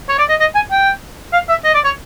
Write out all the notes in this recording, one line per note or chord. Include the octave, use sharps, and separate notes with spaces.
C#5
D5
D#5
D#5
G#5
G5
F5
E5
D#5
D5
C#5